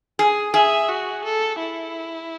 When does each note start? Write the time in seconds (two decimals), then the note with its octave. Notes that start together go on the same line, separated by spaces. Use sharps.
0.19 G#4
0.54 G#4 E5
0.88 F#4
1.24 A4
1.59 E4